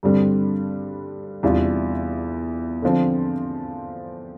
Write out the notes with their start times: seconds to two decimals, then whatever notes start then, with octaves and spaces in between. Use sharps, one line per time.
0.03 G2 D3 G3 C4
1.43 E2 C3 G3 D4 F4
2.82 D3 F3 C4